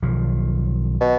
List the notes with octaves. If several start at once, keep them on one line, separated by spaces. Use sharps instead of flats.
B1 D#3 F3
B2